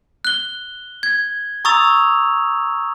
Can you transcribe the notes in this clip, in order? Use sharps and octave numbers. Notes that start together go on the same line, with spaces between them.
F#6 G7
G#6
A#5 C#6 D#6 E6 A6 F7